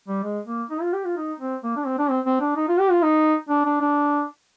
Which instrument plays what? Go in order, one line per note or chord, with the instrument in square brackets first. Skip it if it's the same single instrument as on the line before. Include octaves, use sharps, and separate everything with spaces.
[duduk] G3
G#3
A#3
D#4
F4
G4
F4
D#4
C4
A#3
D4
C4
D4
C4
C4
D4
D#4
F4
G4
F4
D#4
D4
D4
D4